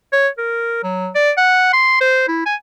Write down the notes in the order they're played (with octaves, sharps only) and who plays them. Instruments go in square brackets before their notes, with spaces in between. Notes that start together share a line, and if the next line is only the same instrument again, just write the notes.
[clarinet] C#5
A#4
F#3
D5
F#5
C6
C5
E4
G#5